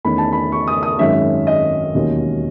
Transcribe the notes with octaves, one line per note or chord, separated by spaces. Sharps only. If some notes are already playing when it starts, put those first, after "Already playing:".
E2 D#3 A3 C#4 B5
A5
B5
C#6
D#6
D#6
G#1 F#2 D#3 G#3 C#4 E5
D#5
E1 D#2 D#3 F#3 C#4